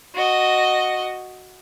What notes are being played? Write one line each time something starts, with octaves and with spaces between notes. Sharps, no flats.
F#4 D#5